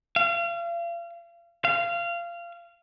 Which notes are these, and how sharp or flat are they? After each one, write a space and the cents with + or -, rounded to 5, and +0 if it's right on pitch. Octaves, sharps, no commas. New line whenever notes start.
F5 -35
F5 -20